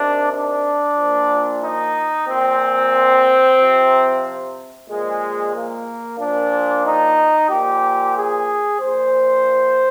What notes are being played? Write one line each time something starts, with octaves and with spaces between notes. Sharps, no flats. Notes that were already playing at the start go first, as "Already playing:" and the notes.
Already playing: C3 D#3 D4
D4
A#2 F3
D#4
A#2 F3 C4
C3 F3
A#2 F3 G#3
A#3
A#2 F3 D4
D#4
A#2 F3 G4
G#4
A#2 F3 C5